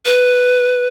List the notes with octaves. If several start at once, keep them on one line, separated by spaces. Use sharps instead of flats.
B4